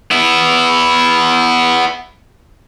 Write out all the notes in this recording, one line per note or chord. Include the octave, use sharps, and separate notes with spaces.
B3 E4